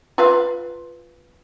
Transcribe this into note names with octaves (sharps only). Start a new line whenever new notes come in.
F4 B4 F5